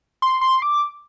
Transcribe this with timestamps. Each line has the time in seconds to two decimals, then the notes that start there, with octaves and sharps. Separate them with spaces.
0.22 C6
0.41 C6
0.62 D6